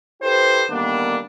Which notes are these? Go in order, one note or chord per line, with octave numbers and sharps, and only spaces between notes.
E4 G4 A4 B4 C5
D3 D#3 G3 A#3 B3 D4